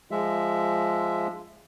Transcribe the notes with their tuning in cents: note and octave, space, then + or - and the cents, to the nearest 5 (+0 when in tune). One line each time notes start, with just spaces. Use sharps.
F3 +0 G#3 +0 E5 +10